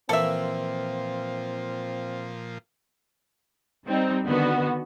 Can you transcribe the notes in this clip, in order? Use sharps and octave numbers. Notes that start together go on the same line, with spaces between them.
A#2 E3 F3 A#3 C4 A4 E5
G3 C4 D#4
D3 D#3 B3 F#4